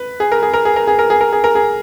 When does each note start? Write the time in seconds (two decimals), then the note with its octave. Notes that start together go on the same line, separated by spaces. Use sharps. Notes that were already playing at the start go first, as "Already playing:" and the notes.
Already playing: B4
0.20 G#4
0.32 A#4
0.43 G#4
0.53 A#4
0.65 G#4
0.76 A#4
0.87 G#4
0.99 A#4
1.10 G#4
1.21 A#4
1.32 G#4
1.44 A#4
1.55 G#4